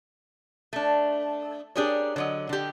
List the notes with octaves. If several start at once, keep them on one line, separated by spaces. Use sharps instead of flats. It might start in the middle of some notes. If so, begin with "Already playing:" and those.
A3 D4
D4 G4 G#4 A#4 C#5
D3 F#3 D#5
D3 G4